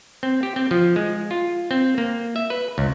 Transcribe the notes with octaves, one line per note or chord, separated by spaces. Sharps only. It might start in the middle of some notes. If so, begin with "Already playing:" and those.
C4
G4
C4
F3
G#3
F4
C4
A#3
E5
B4
C#2